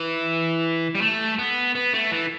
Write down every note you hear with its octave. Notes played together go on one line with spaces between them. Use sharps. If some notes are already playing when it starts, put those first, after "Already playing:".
Already playing: E3
G3
A3
B3
B3
A3
E3